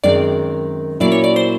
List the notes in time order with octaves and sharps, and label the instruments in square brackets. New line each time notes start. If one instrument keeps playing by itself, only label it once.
[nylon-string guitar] F#2 D#3 G#3 C4 [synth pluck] D5
[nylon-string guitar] A#2 F#3 A#3 C#4 E4 [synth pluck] D5
[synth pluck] C#5
D5
C5